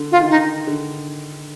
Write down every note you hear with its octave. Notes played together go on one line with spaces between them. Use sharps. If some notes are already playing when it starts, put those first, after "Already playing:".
Already playing: D3
F4
D#3
D3 D#4
D3